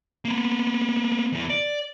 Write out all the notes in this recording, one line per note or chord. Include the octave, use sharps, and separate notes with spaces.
A#3 B3
E2 E3
D5